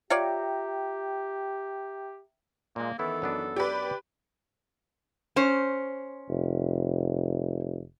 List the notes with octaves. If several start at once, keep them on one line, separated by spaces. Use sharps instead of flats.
F4 G4 C#5 D5 E5 G5 A#5
A#2 G#3 A#3
D#3 E3 B3 C#4 E4 A4
F#2 B3 D4
G4 B4 D5
C#4 C5
F1